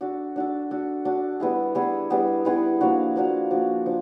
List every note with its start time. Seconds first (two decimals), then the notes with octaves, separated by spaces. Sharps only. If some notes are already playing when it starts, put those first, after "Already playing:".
0.01 D4 F#4 A4
0.36 D4 F#4 A4
0.71 D4 F#4 A4
1.05 D4 F#4 A4
1.40 G3 B3 E4 G#4
1.75 G3 B3 E4 G#4
2.10 G3 B3 E4 G#4
2.45 G3 B3 E4 G#4
2.81 F3 A#3 D4 F#4
3.16 F3 A#3 D4 F#4
3.50 F3 A#3 D4 F#4
3.85 F3 D4